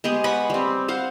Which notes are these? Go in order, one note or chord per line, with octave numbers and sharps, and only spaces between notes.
G#3 B3 G4 G#4
B4 F#5 B5 C#6
G3 C4
C5 F5 F#5